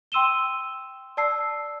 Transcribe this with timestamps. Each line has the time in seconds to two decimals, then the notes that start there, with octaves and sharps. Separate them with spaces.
0.12 G5 C6 E6 D#7 E7 G7
1.17 D5 A5 E6 C7